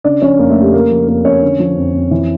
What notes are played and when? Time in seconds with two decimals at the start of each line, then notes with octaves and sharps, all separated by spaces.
0.04 C#3 D4 D5
0.22 F3 C#4 C#5
0.39 F2 A#3 A#4
0.50 A3 A4
0.56 F2
0.61 G4
0.73 C#3 A#3 A#4
0.91 F3
1.08 F2 A#3 A#4
1.25 F2 C#4 C#5
1.42 D3
1.60 F3
1.77 F2
1.94 F2
2.11 E3